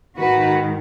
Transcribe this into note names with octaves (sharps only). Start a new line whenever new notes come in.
G#2 D#3 F#4 B4